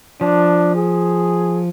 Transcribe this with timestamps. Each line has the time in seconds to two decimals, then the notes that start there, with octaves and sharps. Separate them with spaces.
0.21 F3 D4
0.75 G#4